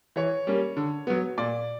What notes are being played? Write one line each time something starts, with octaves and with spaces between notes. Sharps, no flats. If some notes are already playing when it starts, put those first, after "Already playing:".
E3 C#5
G3 A#3 C#4
D3
F#3 B3
A#2 D5